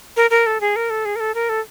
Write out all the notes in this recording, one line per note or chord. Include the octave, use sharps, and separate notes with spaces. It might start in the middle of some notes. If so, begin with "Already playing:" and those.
A#4
A#4
A4
G#4
A#4
A4
G#4
A#4
A4
A#4
A4